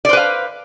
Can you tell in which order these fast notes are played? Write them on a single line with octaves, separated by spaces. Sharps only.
D5 C5 B4 F5